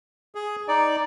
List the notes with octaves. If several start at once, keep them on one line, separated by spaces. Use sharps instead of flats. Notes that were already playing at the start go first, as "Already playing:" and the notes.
G#4
D#4 D5